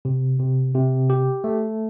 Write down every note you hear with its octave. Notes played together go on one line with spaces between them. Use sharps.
C3
C3
C3
G4
A3